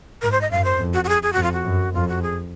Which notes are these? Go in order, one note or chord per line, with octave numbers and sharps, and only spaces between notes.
G#2 A#4
C5
D#5
F#2 F5
C5
F2
F#4
F#4
G#4
G#4
F2 F#4
F4
F#4
F#2
F2 F4
F#4
G#4